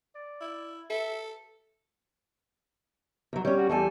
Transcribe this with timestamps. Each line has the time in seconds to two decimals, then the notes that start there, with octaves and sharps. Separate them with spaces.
0.15 D5
0.41 E4
0.90 A4 E5
3.33 E2 F#3
3.45 G3 C#4 C#5
3.57 F#4
3.69 E2 G3 A4 G#5